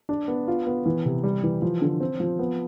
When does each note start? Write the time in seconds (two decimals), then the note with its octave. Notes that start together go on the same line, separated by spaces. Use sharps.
0.09 D4
0.28 B3
0.48 F4
0.67 B3
0.86 E3
1.05 C3
1.24 G3
1.43 E3
1.62 F3
1.82 D3
2.00 C4
2.20 F3
2.39 B3